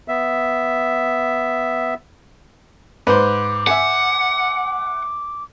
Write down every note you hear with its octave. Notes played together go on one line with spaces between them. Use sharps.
B3 E5
G#2 B4 C5 D6
E5 F#5 G#5